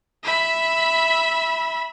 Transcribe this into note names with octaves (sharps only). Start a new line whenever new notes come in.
E5 B5